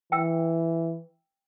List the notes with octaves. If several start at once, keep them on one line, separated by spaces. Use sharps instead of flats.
E3 G5 E6